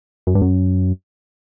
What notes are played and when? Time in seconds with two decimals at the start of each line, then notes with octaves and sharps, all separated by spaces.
0.27 F#2
0.35 G2
0.42 F#2